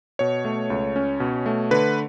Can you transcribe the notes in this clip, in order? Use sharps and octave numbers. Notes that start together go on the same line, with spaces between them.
B2 C#5
A3
C#2
C#4
B2
A3
D3 B4